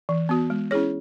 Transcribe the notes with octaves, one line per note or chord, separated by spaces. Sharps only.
E3
B3 F#4
G#3
C#4 E4 G#4 C#5